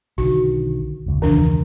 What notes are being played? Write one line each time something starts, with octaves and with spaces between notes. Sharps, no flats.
B1 D3 D#3 F#4
E1 C#2
E1 C#2 D#3 E3 D4